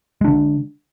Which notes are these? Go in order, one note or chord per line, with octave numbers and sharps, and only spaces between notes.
D3 G#3 D4